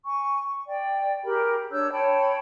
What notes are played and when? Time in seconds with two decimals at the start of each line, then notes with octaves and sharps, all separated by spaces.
0.06 G#5 C#6
0.67 D5 G5
1.24 G4 G#4 A#4 B5
1.71 D4 C#5 E6 G6
1.92 C#5 G5 A5 B5